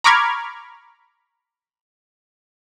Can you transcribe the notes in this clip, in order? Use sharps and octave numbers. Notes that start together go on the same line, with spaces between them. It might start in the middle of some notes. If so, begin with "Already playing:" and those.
A#5 B5 C#6 D6 F6 G#6